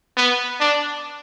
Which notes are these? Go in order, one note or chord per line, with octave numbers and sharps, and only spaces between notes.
B3
D4